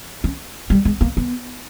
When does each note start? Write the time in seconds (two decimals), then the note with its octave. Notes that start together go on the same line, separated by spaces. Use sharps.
0.24 C#4
0.70 G3
0.85 G#3
1.01 A#3
1.17 B3